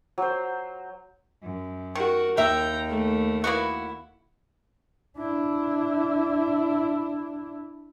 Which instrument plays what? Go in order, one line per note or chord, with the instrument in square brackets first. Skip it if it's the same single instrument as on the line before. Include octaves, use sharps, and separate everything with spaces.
[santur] F#3 C5
[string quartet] F#2
[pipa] D#3 [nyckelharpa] F#4 A#4
[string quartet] D#2 [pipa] A#4 E5 [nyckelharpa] G5 A#5
[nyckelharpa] A3
[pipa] A#3 B3 F#4 [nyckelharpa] E4
[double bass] D4 E4